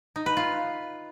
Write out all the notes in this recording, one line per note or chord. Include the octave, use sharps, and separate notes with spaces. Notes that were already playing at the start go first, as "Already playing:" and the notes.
D#4
B4
F4